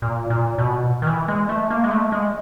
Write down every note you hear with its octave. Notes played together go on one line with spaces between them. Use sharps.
A#2
A#2
B2
D#3
E3
G#3
A3
A#3
G#3
A3
G#3